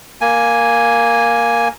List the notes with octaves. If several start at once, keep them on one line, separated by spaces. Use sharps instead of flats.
A#3 G#5